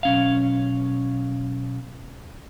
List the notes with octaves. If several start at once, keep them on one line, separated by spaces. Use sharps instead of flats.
B1 C#4 F5